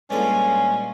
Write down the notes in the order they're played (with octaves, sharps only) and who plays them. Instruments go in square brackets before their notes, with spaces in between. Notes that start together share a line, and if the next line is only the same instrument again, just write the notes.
[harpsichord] G2 A4 [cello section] A#2 G#3 F4 [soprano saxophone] C#4